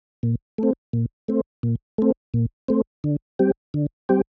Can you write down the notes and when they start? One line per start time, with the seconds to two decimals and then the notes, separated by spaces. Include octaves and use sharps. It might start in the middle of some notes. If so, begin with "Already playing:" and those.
0.23 A#2
0.58 A3 C4
0.93 A#2
1.28 A3 C4
1.63 A#2
1.98 A3 C4
2.34 A#2
2.68 A3 C4
3.04 D3
3.39 G3 C4 G4
3.74 D3
4.09 G3 C4 G4